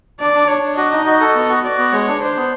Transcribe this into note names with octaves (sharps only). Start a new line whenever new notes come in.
D4 D5
D4
D4 C#5
D4
F#4 D#5
D#4
F#4
A4
B3
F#4
F#4 D5
B3
G#3 C#5
D4
D4 C5
B3